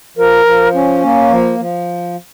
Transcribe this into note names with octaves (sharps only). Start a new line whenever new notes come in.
F3 A#4
F3
C#4
A#3
F3
F3